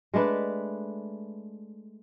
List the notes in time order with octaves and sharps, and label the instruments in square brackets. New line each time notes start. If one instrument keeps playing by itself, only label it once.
[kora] G#3 A3 D4 B4